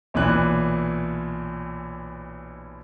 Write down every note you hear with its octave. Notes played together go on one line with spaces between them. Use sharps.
B1 A#2 E3 F#6